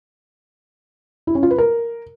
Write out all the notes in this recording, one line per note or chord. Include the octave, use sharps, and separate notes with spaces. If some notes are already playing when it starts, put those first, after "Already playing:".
E4
C#4
F4
B4
A#4